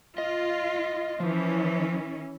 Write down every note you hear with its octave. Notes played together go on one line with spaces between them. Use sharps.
F4 D#5
E3 F3 C#4